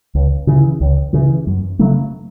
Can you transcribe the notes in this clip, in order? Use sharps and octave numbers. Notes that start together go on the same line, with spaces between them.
C#2
C#3 E3
C#2
C#3 E3
F#2
C#3 F#3 A3